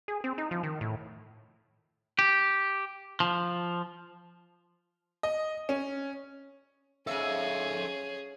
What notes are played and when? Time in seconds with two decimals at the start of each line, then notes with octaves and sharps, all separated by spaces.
0.08 G#4
0.24 C4
0.38 D#4
0.51 F3
0.63 D#3
0.81 A2
2.19 G4
3.20 F3
5.23 D#5
5.69 C#4
7.07 G#2 C#4 G#4 A4 E5 F5